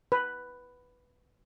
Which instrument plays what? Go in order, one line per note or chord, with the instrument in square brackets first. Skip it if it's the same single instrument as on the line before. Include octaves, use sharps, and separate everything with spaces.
[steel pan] B4